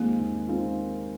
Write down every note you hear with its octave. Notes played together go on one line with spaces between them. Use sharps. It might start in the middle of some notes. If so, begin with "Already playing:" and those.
Already playing: D#2 D#3 G#3 A#3 C4 F4
D#2
D#3 G#3 C4 F4